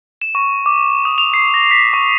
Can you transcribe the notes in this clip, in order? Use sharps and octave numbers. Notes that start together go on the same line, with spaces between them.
E7
C#6
D6
D#6
F7
C7
A#6
B6
C#6